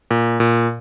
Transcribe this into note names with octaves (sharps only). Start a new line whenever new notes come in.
A#2
A#2